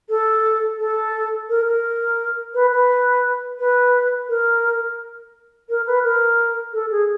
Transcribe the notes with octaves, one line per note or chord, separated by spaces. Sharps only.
A4
A4
A#4
A#4
B4
B4
B4
A#4
A#4
B4
A#4
A4
G#4